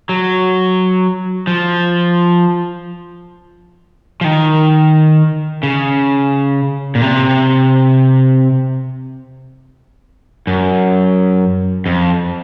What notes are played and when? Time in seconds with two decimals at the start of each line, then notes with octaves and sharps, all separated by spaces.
0.09 F#3
1.47 F3
4.21 F3
4.24 D#3
5.63 C#3
6.95 A#2
7.01 C3
10.47 F#2
11.86 F2